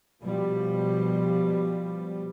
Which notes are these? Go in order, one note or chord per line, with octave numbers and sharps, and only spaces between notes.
B2 F3 G3